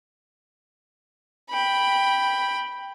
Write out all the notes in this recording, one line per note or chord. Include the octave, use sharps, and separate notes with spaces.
G5 B5